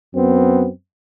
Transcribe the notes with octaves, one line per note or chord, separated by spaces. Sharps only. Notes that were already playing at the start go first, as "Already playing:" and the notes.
F#2 B3 C4